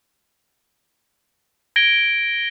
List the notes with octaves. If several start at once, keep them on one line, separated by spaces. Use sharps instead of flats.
G#6 A#6 D7 G7